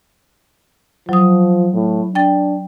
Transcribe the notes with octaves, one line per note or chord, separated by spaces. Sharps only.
F3 F#3 D#6
A2
D4 G5 A6